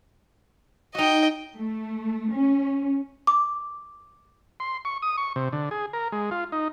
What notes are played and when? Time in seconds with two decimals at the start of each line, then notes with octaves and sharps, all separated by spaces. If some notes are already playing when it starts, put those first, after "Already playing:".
0.95 D#4 F#4 D#5 G5
1.55 A3
2.33 C#4
3.27 D6
4.60 C6
4.85 C#6
5.02 D#6
5.17 C#6
5.36 C3
5.53 D3
5.71 G#4
5.93 A#4
6.12 G#3
6.31 F4
6.52 D#4